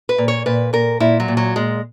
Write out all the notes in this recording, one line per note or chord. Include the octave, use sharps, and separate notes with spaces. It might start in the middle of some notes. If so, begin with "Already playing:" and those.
B4
A#2
C#5
A#2 B4
A#2 A#4
A#2 E4
F#3
A#2
F#3
A#2 G#3